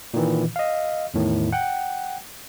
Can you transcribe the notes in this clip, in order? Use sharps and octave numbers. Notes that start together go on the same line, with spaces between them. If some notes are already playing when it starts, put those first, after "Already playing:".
A#2 D#3 E3
D#5 F5
E2 A2 D#3
F#5 G5